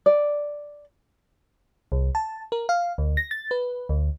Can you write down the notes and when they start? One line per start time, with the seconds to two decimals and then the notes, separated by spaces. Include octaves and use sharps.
0.06 D5
1.92 C2
2.15 A5
2.52 A#4
2.69 F5
2.98 D2
3.17 A#6
3.31 A6
3.51 B4
3.89 D2